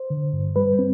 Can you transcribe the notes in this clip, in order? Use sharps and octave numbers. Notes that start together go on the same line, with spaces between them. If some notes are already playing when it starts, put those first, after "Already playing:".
Already playing: C5
D3
G2
G3 B4
C4